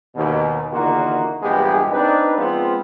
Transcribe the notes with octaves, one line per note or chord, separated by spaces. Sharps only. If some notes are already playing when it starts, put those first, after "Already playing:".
D#2 B2
E2 D3 D#3 A#3 F4 F#4
A#1 G2 E3 G#3 B3 G4
C4 D4 D#4 B4
F3 G#3 B3 C4 F4